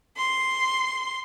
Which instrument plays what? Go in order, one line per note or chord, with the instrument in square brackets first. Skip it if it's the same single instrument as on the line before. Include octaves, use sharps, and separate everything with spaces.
[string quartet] C6